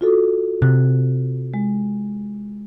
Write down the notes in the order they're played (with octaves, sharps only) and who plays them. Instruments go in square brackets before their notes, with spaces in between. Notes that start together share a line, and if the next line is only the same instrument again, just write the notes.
[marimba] F4 F#4 A4
[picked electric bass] C3 [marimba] F#6
[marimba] G#3